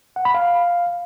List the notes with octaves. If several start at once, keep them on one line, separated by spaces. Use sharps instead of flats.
F#5
B5
F5